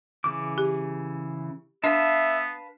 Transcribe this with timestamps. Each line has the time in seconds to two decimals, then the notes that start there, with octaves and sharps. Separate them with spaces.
0.24 C#3 E3 D6
0.58 G4
1.84 B3 D4 B4 E5 F5 A5